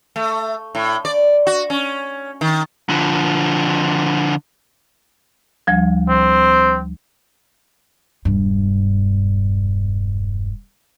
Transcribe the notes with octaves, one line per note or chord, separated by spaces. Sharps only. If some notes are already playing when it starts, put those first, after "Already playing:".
A3
A2
D5
F#4
C#4
D#3
D3 F3
D2 F3 G3
C4
E1 G2